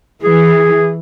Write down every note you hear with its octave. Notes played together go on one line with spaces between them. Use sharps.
E3 G#4